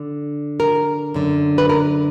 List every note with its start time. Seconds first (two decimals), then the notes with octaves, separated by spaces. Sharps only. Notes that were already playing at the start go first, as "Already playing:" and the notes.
Already playing: D3
0.60 A#4
1.14 F#2 D3
1.58 B4
1.69 A#4